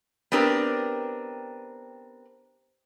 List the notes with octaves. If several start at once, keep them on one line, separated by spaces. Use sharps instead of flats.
B3 C4 D4 G4 A#4